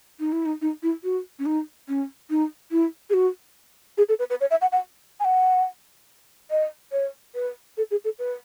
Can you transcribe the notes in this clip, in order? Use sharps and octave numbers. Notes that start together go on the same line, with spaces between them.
D#4
E4
D#4
D#4
E4
F#4
C#4
D#4
C#4
D#4
E4
G#4
F#4
G#4
A4
B4
B4
C#5
E5
F#5
F#5
G#5
F#5
D#5
C#5
B4
A4
G#4
A4
B4